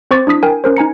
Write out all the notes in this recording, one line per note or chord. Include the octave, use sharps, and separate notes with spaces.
C4 C5 C#6 D6 A6
D4 E4 D#6 B6
A#4 G5 G#5
C#4 A#4 C5
D#4 G#5 A#5 C#7